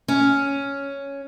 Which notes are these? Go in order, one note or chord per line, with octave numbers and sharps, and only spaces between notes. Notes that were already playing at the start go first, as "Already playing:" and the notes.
C#4